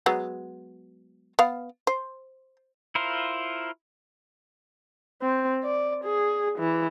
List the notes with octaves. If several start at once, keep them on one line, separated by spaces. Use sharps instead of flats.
F#3 G#3 B3
B3 F5
C5
E4 F4 A#4 C5
C4
D5
G#4
E3